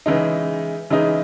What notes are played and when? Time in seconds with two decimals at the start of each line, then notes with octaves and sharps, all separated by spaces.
0.06 C#3 E3 G#3 D#4
0.90 C#3 E3 G#3 D#4